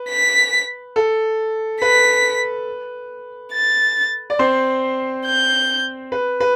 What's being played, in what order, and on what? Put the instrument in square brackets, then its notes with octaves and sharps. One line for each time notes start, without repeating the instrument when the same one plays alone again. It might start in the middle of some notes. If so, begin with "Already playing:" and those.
Already playing: [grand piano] B4
[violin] B6
[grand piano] A4
[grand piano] B4 [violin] B6
[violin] A6
[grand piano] D5
C4 C5
[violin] G6
[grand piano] B4
B4